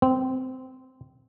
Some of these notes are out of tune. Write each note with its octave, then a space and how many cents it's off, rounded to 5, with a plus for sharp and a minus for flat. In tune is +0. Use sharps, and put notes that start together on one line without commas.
C4 -15